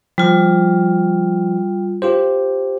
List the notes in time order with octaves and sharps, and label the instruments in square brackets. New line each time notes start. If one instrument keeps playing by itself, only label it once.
[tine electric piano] F3 [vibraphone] G3 F4
[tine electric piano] F4 G4 C5